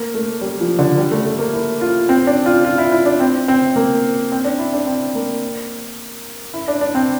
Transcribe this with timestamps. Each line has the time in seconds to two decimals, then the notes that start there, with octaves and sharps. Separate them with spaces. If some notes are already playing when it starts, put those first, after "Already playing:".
Already playing: A#3
0.14 A3
0.41 G3
0.60 F3
0.79 D3
0.98 G3
1.12 A3
1.25 A3
1.39 A#3
1.53 E4
1.81 F4
2.09 C4
2.27 D4
2.46 F4
2.65 F4
2.78 E4
2.92 E4
3.06 D4
3.20 C4
3.48 C4
3.76 A#3
4.32 C4
4.44 D4
4.59 E4
4.73 D4
4.87 C4
5.15 A#3
6.54 E4
6.68 D4
6.81 D4
6.95 C4